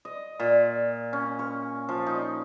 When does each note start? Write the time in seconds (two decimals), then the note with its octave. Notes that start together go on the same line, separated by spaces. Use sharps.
0.05 D#5
0.40 A#2
1.13 C#4
1.39 C#6
1.89 F3
2.06 D#4